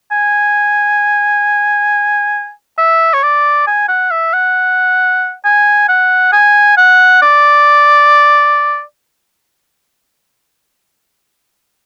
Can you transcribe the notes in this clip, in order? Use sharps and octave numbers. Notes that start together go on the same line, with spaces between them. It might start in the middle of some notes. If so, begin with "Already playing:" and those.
G#5
E5
C#5
D5
G#5
F#5
E5
F#5
G#5
F#5
G#5
F#5
D5